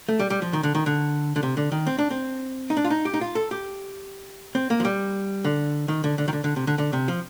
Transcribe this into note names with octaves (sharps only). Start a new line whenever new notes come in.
A3
G3
G3
F3
D#3
D3
D#3
D3
D3
C3
D3
D#3
C4
D4
C4
D#4
D4
F4
D#4
G4
D#4
F4
A4
G4
C4
A#3
F3
G3
D3
D#3
D3
D3
D#3
D3
D3
C3
D3
D3
C3
F3